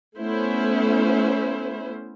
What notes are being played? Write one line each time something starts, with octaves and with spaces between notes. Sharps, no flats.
A3 B3 C#4 E4 C5